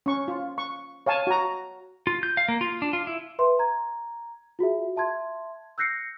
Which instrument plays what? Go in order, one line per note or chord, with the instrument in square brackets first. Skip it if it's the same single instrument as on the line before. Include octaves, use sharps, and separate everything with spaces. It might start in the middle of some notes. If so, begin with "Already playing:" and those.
[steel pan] C#4 C#6
F4
C#6
C#5 F5 G#5 A5
F#4 A#5
[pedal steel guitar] F4
G6
F5
A#3
F4
D4
F4
E4
[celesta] B4 E5 C6
A#5 G#6
F4 F#4 G#4 E5
E5 A5 C6 G#6
E6 F#6 G6 A#6 C7 C#7